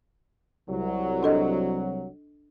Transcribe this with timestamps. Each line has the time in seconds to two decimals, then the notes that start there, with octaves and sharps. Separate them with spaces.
0.69 C2 F#3
1.23 D4 A4 D#5